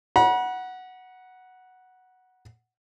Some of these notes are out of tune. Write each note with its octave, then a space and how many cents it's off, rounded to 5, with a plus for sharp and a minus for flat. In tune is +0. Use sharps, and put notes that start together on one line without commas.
F#5 +0 B5 -45